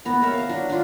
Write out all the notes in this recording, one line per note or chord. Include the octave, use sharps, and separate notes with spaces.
B3 A#5
B3 A#4 C#5 E5
F5 A#5
F#3 D4
D4 F4